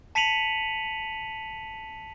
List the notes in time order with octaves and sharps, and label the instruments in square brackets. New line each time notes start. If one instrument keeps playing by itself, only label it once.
[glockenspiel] A5 B6 C#7 D#7 F7 F#7